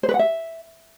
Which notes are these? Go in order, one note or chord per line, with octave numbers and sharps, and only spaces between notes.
C5
B4
F#5
E5